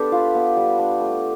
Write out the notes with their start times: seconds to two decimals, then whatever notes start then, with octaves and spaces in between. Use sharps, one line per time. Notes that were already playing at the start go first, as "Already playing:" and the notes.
Already playing: B3 D4 G4 A4 B4
0.12 F4
0.35 B3
0.57 G3
0.79 D4
1.00 A3